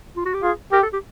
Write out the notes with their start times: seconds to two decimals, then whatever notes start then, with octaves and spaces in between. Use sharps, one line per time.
0.16 F4
0.25 F#4
0.34 G4
0.43 F4 G#4
0.72 G4 A#4
0.83 A4
0.93 G4